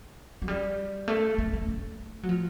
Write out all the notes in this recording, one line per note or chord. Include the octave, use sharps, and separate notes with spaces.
F#3
G3
A3
A3
A3
A3
F#3
F3